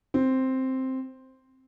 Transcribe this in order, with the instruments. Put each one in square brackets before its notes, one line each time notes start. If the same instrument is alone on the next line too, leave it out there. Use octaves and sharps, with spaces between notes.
[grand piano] C4